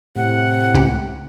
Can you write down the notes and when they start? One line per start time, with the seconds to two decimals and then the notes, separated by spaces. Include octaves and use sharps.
0.16 A2 C3 F#5
0.74 C#2 G4